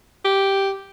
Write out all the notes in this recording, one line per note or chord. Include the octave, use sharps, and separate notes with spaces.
G4